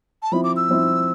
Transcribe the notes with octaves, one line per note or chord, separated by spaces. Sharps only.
A5
F3 C4 E4 B5
D6
E6
F3 C4 E4